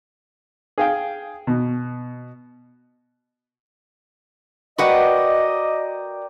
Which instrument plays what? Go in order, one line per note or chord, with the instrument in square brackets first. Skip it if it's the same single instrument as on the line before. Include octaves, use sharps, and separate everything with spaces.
[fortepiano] G#4 F5 G5
B2
[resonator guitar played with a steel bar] F#4 B4 F#5 [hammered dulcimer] A#4 D5 G5 [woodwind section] D#5